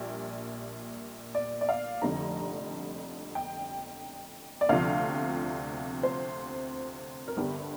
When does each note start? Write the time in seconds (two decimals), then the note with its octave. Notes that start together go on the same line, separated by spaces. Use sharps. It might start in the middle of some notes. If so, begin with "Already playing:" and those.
Already playing: A#1 A#2 G3
1.35 D5
1.61 D5
1.69 F5
2.02 F1 F2 D3 G3 A#5
3.35 G5
4.61 D5
4.69 D2 C3 F3 F5
6.03 C5
7.28 A#4
7.37 G1 G2 D3 G4